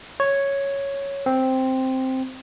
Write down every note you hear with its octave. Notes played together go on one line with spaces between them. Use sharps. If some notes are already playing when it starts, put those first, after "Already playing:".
C#5
C4